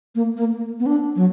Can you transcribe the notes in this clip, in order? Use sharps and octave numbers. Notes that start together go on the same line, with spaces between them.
A#3
A#3
B3
D4
F#3